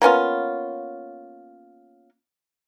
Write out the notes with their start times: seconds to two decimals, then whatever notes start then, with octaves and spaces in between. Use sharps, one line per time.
0.02 A#3 B3 C#4 F4